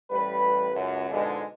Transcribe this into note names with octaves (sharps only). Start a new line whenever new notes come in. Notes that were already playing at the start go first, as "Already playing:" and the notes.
A1 G3 B4
C#2 F#2
G#2 B2 D3 F3 G#3